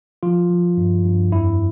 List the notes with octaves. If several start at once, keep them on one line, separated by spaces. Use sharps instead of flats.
F3 F4
F3
G2
G2
F2 E4